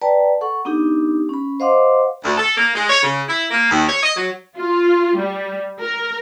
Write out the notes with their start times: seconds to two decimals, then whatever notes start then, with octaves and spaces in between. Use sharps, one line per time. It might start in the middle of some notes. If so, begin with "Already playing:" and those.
0.01 B4 D5 G5 A5 A#5
0.41 A4 F#5 C#6
0.65 B3 D4 D#4 G4
1.29 C#4 B5
1.60 C5 D#5 F5 F#5 C6 D6
2.24 D2
2.37 A4
2.56 A#3
2.75 G#3
2.90 C#5
3.03 C#3
3.28 E4
3.50 A#3
3.71 D#2
3.89 C#5
4.03 D#5
4.15 F#3
4.58 F4
5.17 G3
5.80 A#4